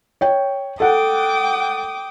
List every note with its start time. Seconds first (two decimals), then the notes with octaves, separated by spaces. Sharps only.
0.21 C#5 G5
0.80 A4 F#5 G5 D6 D#6